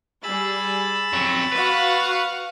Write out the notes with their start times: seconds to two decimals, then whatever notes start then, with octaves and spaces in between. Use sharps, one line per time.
0.23 G3 G#4 B5 E6 A6
1.13 F2 F#3
1.52 F#4 B4 F5 F#5